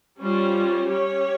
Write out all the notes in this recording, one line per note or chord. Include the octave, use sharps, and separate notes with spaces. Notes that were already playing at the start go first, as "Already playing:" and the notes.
G3 C#4 F4 C5
C#4 G4 C#5